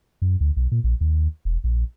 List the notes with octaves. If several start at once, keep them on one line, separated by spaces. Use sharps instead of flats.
F#2
D2
B1
A#2
A#1
D#2
E1
A#1